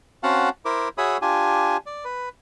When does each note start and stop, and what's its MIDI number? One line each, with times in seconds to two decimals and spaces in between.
0.23 0.49 60
0.23 0.49 61
0.23 0.49 66
0.23 0.49 77
0.23 0.49 78
0.23 0.49 81
0.65 0.88 64
0.65 0.88 70
0.65 0.88 72
0.65 0.88 86
0.98 1.17 66
0.98 1.17 68
0.98 1.17 73
0.98 1.17 76
0.98 1.17 83
0.98 1.17 87
1.22 1.77 62
1.22 1.77 65
1.22 1.77 67
1.22 1.77 80
1.86 2.04 74
2.05 2.29 71